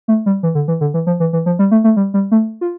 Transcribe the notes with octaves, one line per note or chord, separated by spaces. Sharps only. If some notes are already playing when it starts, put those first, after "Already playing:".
A3
G3
E3
D3
E3
D3
E3
F3
E3
E3
F3
G3
A3
A3
G3
G3
A3
F4